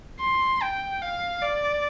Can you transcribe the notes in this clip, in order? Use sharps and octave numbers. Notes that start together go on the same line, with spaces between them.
C6
G5
F5
D5